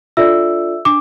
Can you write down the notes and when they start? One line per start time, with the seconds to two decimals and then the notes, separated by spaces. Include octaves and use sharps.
0.17 D4 F4 A4 D5 E5 E6
0.85 D4 D6